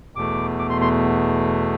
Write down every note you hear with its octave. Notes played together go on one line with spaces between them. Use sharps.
E2 B2 A3 D6
D6
C6
C6